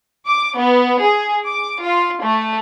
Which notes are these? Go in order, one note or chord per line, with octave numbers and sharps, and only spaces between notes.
D6
B3
G#4
D6
F4
A3